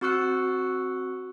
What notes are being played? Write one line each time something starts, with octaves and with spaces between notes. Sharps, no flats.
C4 F#4 C#6 E6 F#6 C#7